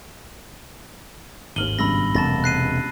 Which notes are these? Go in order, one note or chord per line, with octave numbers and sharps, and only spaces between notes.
G#1 D#2 F6 D#7 F#7 G7
C#2 G2 B2 B5 E6 A#6
E1 C3 A3 A5 A6 A#6
F#6 C7 D#7